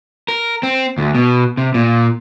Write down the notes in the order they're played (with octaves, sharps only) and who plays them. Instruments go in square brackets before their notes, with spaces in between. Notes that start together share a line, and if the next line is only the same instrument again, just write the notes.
[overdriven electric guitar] A#4
C4
D2
B2
C3
A#2